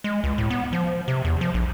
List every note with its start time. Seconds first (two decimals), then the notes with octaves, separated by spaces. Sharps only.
0.04 G#3
0.24 C#2
0.38 A2
0.50 B3
0.73 F3
1.08 C3
1.25 E2
1.41 F3
1.54 A#1